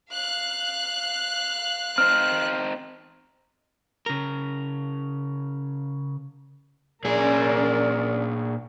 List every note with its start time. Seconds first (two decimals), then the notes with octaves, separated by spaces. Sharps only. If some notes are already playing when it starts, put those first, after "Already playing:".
0.11 F5 F#6
1.98 C4 D#4 C5 F6
4.06 C#3 A#4
7.05 A#2 C#4 G#4 A#4 D5